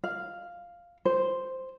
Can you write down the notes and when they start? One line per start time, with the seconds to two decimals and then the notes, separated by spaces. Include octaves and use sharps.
0.04 F5
1.05 C5